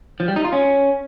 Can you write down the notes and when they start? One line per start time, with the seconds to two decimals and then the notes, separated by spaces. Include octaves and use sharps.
0.20 F3
0.28 G3
0.36 D#4
0.44 F4
0.53 C#4